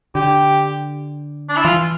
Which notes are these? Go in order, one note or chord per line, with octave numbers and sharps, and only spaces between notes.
D3 G4
D4
E4
E3 F4